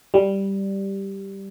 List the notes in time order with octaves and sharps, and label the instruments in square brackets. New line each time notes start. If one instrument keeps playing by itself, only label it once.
[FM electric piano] G3